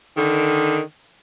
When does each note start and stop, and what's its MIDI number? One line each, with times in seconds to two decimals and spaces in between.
0.17 0.80 50
0.17 0.80 51